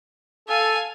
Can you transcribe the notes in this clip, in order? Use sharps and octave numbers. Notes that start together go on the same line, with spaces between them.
A4 F5 G#5